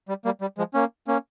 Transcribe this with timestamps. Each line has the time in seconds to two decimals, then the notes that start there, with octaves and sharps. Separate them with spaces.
0.09 G3
0.25 G3 A#3
0.41 G3
0.58 F3 G#3
0.74 A#3 C#4
1.08 A#3 C#4